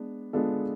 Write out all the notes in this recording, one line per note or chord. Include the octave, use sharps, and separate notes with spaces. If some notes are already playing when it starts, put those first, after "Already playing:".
Already playing: G#3 B3 D4
G#3 B3 D4 F4 A4